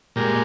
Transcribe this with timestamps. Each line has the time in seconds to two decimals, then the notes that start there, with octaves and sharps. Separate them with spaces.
0.16 A#2 G#3 G4 A#4